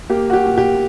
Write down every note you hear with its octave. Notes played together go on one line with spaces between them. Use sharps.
A#3 G4
F#4
G4
A#2
G4